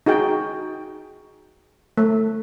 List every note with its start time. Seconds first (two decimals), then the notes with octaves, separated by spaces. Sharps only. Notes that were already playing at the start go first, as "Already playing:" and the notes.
0.06 D#4 F#4 G#4 G5
1.97 A3